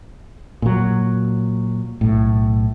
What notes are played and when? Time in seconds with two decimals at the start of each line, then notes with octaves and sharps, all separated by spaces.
0.62 A#2 F#3
2.01 B1 A2